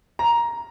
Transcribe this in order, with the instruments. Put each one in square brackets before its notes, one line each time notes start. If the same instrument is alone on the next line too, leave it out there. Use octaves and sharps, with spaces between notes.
[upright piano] A#5